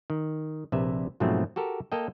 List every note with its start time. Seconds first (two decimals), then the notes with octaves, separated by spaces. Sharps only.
0.10 D#3
0.72 A#1 C3 B4 E5
1.20 G#2 B2 F3 F#3 A3 C4
1.56 F#4 G4 A4 A#4
1.92 A#3 A4 D#5 G5